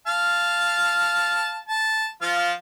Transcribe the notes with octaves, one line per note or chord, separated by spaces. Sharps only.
F5 A5
A5
F3 F4 F5